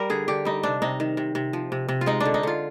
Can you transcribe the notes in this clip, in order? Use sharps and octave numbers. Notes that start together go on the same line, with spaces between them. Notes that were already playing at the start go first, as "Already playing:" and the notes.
Already playing: G3 A#4
D3 G#4
D3 G4
G3 D#4
C3 D4
C3 D#4
D#3
C3
C3
F3
C3
C3
F4
G#3 D#4
D3 D4
D#4
D3 F4